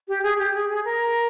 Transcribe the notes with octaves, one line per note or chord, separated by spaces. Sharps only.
G4
G#4
G4
G#4
G#4
A#4